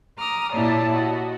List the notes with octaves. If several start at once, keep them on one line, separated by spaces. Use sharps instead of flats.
A#5 D6 D#6 F6
A#2 E4 G4 C#5 D5 A5
F#4 D#5